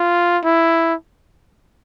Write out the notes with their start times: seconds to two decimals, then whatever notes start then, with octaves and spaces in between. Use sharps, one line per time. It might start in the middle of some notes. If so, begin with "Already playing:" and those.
Already playing: F4
0.44 E4